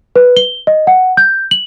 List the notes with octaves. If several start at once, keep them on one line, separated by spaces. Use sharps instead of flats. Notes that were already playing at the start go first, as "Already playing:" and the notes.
B4
G7
D#5
F#5
G6
F#7